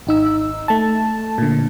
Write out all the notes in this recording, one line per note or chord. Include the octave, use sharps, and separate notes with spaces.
G#1 D#4 E6
A3 A5
A#2 D3